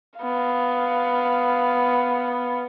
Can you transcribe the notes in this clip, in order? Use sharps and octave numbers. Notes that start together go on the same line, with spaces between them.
B3 F5